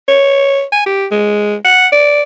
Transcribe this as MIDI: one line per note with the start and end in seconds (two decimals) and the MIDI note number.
0.08 0.63 73
0.72 0.84 80
0.86 1.06 67
1.11 1.55 56
1.64 1.87 78
1.92 2.22 74